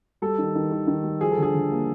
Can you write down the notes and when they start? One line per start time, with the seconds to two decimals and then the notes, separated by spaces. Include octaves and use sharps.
0.22 G3 A4
0.38 D#3
0.55 D#3
0.72 D#3
0.87 D#3
1.04 G3
1.21 F3 G#4
1.31 A4
1.38 D3 G#4
1.54 D3
1.71 A#3